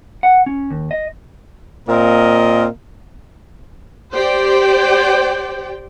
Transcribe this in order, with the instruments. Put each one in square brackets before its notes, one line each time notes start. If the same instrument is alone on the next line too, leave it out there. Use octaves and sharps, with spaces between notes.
[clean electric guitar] F#5
C#4
D#2
D#5
[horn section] A#2 A#3 C4 A#4 D#5
[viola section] G4 C5 D5 G5